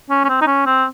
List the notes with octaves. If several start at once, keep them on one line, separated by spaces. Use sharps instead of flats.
C#4
C#4
C4
D#4
C#4
C4